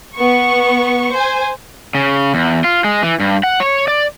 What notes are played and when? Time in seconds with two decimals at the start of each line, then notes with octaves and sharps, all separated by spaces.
0.15 B3 C#6
1.12 C5 G#5
1.95 C#3
2.34 E2
2.64 F4
2.84 G#3
3.03 E3
3.20 G2
3.43 F#5
3.60 C#5
3.88 D5